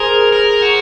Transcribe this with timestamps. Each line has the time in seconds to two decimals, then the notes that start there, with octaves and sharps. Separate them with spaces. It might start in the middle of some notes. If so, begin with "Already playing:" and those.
Already playing: G#4 A#4 C5
0.32 A#4
0.62 F#4